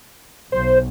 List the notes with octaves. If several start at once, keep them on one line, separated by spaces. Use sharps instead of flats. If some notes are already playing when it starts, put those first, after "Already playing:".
B1 C5